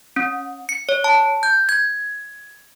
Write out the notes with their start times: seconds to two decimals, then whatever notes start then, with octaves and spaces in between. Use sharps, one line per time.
0.16 C#4
0.69 C#7
0.89 C#5
1.04 A5
1.43 G6
1.69 G#6